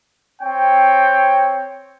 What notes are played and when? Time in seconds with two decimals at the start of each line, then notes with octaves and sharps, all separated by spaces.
0.41 C4 C#5 G5